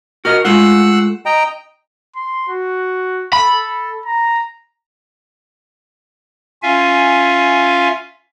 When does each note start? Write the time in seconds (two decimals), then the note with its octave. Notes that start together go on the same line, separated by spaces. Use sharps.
0.25 F#4 A#4 D#5 F6
0.45 G#3 A3 F4 F#5 E6 F#6
1.26 D#5 G5 A#5
2.16 C6
2.49 F#4
3.33 A4 B5
4.06 A#5
6.63 C#4 F4 E5 F5 G#5